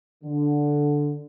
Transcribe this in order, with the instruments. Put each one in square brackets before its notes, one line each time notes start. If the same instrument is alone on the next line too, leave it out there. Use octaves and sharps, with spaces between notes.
[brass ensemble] D3